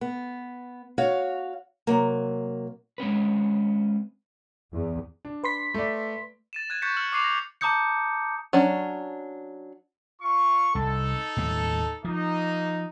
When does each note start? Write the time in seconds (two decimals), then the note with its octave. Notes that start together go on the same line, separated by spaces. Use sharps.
0.01 B3
0.98 F#4 C#5 F5
1.87 C3 F#3 A#3
2.98 G#3 C4 C#4 B4
4.75 E2
5.25 D4
5.44 B4 C6 B6
5.74 A3 D5
6.53 A6 D#7 E7
6.70 F#6 G#6 D#7
6.82 C#6 F#6 G6 A6 B6 C#7
6.97 F6 C#7 F#7
7.12 C#6 D6 F#6 C7 D#7 F7
7.24 A#6
7.61 A5 A#5 D6 D#6 G6 C#7
8.53 F#3 C#4 D4
10.21 F4 C#6
10.75 C2 D#4 A4
11.37 D#2 A2 G3
12.05 F3 A#3 D#4